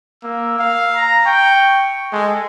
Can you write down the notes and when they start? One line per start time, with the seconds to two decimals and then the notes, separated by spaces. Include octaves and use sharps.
0.23 A#3 E6
0.59 F5
0.95 A#5
1.26 G5 C#6
2.13 G#3 A4